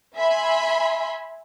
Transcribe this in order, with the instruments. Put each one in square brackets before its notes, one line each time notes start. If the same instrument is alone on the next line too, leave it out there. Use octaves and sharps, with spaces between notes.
[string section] E5 G#5 B5 C6